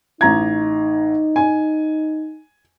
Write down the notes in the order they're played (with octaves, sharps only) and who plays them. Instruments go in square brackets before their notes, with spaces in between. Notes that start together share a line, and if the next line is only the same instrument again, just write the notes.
[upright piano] A1 A#5 G#6 [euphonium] D#4
[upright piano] G#5